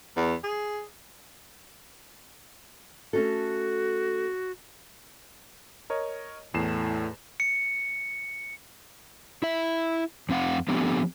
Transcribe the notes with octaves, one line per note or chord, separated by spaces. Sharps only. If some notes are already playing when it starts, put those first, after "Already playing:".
E2
G#4
A3 C#4 F#4 A4
A#4 C#5 D#5
E2 A2 C7 E7
C#7
E4 E5
F2 C4 F5 F#5
F3 A3 B3 C4 D4 G4